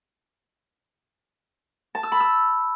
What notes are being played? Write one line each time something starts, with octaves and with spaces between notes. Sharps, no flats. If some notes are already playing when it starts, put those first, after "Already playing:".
A5
E6
B5
E6